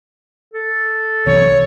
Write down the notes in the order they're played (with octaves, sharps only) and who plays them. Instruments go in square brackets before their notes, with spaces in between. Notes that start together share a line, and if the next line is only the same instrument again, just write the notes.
[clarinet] A4
[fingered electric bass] B1 C3 E3 [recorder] C#5